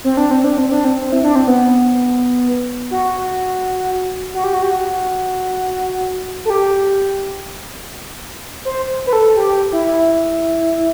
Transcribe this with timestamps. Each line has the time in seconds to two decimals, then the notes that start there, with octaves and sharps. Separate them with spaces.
0.04 C4
0.17 D4
0.31 C4
0.44 D4
0.58 C4
0.71 D4
0.84 C4
1.12 E4
1.24 D4
1.36 C4
1.47 B3
2.91 F#4
4.34 F#4
4.44 G4
4.53 F#4
4.62 G4
4.71 F#4
6.45 A4
6.50 G4
8.65 C5
9.07 B4
9.13 A4
9.36 G4
9.72 E4